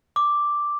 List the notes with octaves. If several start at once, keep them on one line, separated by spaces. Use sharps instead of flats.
D6